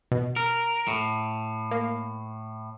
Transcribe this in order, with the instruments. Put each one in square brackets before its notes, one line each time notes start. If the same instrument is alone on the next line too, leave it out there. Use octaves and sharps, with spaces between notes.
[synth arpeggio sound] B2
[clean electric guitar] A#4
A2
[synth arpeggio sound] A#3 C7